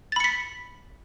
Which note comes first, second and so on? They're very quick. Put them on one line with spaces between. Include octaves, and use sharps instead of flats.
A6 B5 C#7 B6